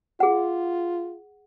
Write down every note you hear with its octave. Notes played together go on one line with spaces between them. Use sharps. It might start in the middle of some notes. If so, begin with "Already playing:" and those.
F4 G#4 F#5